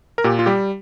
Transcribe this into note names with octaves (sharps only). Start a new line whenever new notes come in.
A#4
A#2 G4
F4
G3 G4